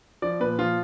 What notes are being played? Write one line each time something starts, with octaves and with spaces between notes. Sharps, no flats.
F3 D5
A#2 B4
F3 F4